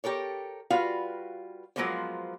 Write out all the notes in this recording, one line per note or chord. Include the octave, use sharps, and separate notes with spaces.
G4 A4 A#4 C#5
G3 F4 F#4 B4 F5
F3 F#3 G#3 A#3 B3 C5